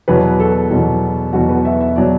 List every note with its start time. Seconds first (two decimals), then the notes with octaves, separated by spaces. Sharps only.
0.08 E2 B2 F#3 B4
0.40 A4
0.71 E2 B2 F#3
1.33 E2 B2 F#3 F#4
1.49 B4
1.65 E5
1.80 E5
1.96 B2 F#3 D5